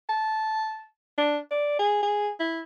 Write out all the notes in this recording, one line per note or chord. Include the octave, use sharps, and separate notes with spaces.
A5
D4
D5
G#4
G#4
E4